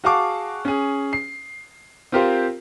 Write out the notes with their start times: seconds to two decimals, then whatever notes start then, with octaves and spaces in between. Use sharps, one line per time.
0.04 F#4 G#4 F5 A5 C#6 D6
0.65 C#4 G#4
1.13 C7
2.12 C4 F4 G4 A#4 C5 F5